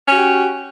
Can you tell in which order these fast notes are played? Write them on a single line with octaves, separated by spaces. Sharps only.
C#4 F#4 G4